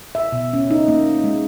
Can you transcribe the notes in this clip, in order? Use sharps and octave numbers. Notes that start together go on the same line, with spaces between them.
E5
B2
C#4
D#4
A#3
G#3